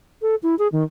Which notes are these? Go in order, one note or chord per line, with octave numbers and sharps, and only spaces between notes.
A4
E4
G#4
D#3